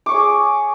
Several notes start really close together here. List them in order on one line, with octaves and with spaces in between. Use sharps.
D6 C#6 C#5 G#4